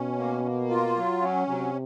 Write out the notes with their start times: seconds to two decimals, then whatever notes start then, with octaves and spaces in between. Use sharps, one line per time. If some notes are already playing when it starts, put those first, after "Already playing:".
Already playing: B2 C#4
0.18 A#3
0.45 A#3
0.70 F4
0.96 F#3
1.23 C#4
1.48 C3 F#3